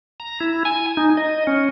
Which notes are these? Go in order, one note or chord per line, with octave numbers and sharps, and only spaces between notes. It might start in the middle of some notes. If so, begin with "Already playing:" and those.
A#5
E4
G#5
D#4
D#5
C#4